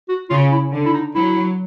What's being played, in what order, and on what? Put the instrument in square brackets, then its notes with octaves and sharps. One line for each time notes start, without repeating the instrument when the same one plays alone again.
[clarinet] F#4
[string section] C#3 [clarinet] F4
[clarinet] E4
[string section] D3
[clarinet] E4
D#4
[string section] F#3 [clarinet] E4